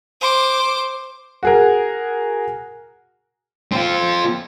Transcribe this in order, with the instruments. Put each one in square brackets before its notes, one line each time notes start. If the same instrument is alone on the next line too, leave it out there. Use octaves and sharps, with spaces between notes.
[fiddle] C5 D6
[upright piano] F#4 G#4 A#4
[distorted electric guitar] C4 F4